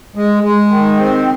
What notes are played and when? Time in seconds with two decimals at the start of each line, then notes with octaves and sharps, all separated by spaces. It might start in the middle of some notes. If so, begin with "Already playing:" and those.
0.15 G#3
0.43 G#3
0.69 D#3
0.97 C4